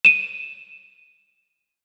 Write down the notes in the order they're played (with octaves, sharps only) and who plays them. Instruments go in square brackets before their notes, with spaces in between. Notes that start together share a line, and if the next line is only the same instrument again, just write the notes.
[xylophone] D#7 E7